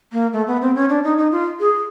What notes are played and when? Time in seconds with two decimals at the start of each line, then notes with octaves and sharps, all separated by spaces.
0.12 A#3
0.33 A3
0.47 B3
0.61 C4
0.75 C#4
0.89 D4
1.04 D#4
1.18 D#4
1.32 F4
1.60 G#4